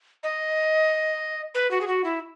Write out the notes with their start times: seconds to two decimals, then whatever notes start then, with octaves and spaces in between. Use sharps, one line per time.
0.23 D#5
1.55 B4
1.71 F#4
1.81 G#4
1.87 F#4
2.04 E4